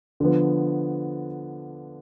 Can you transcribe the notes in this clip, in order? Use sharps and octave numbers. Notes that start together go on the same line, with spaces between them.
D3 F3 B3